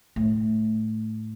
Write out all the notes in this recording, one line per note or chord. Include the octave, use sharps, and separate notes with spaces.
A2